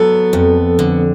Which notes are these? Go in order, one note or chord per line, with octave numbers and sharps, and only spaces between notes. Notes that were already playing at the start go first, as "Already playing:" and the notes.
Already playing: F#3 B3 A4
F2
D3